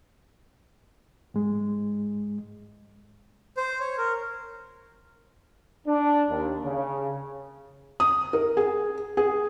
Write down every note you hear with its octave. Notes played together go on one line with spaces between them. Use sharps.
G#2 G#3
C5
C#5
A#4
D4
D#2
C#3
D#6
A#4
G#4
G#4